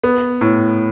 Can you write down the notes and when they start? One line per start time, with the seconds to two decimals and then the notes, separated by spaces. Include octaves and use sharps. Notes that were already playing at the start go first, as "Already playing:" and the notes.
0.04 B3
0.41 A2